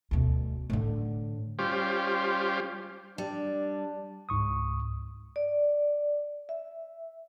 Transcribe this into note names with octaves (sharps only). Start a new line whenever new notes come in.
D2 B2
A2 D3
G3 C#4 F4 G4 C5
G3 D4
C#2 G#2 C#6 D#6
D5
E5